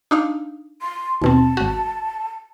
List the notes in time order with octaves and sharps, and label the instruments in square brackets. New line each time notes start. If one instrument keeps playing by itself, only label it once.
[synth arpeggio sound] D4 D#4 F5
[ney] C6
[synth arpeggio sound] D#2 B2 C4 [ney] A5
[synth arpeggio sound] G#1 F#4